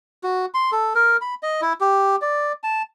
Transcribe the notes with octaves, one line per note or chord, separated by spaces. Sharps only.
F#4
C6
A4
A#4
B5
D#5
E4
G4
D5
A5